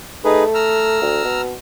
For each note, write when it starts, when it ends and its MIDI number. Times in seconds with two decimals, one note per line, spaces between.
0.25 1.01 57
0.25 0.44 63
0.25 0.44 68
0.25 0.44 71
0.54 1.41 82
0.54 1.41 88
0.54 1.41 89
1.02 1.24 38
1.24 1.53 47